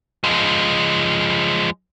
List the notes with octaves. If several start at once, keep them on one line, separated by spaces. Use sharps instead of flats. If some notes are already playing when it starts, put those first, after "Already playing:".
F3 G#3